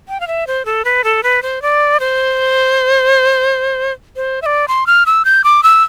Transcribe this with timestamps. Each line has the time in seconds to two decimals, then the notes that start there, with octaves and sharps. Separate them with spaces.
0.08 G5
0.20 F5
0.27 E5
0.47 C5
0.65 A4
0.85 B4
1.04 A4
1.23 B4
1.42 C5
1.62 D5
2.00 C5
4.16 C5
4.42 E5
4.46 D5
4.68 C6
4.87 F6
5.06 E6
5.25 G6
5.44 D6
5.63 E6